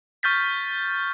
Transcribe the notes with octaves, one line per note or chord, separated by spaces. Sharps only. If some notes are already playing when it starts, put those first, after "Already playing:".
C#6 F6 G6 A6 B6